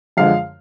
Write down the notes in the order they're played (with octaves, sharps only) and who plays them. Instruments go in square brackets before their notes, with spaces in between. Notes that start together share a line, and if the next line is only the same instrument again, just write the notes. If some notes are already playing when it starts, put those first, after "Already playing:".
[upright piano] F#2 D3 F3 G#3 F5